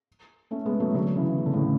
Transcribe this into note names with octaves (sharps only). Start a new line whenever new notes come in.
A3 C#4
G#3 B3
F#3 A3
D3 F#3
C#3 E3
C#3
D3
A2 C#3